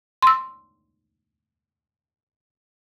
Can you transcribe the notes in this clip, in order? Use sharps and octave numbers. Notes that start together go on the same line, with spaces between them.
C6 E6